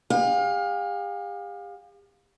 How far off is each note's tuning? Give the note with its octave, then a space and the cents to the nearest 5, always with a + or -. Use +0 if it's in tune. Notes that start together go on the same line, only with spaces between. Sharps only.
G4 +45 F5 +30